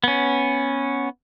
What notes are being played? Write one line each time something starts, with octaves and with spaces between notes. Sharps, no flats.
B3 C#4